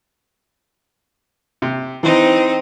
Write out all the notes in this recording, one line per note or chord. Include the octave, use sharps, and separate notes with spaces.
C3
E3 C4 D#4